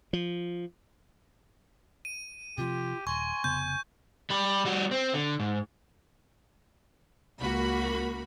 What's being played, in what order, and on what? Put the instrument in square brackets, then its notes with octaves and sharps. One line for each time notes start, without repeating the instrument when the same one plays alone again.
[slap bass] F3
[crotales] D#7
[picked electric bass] C3 F3 [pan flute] F4 [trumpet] G4
[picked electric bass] D#1 [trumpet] G#5 [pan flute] C6 [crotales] C#6
[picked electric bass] F1 C#3 B3 [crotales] G6
[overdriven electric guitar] G3 B5
G3 F#4
C4
D3
G#2
[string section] C#2 A#3 F#4 B5